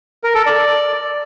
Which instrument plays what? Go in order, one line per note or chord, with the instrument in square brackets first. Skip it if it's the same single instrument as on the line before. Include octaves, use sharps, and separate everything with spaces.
[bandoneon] A#4
A4
D5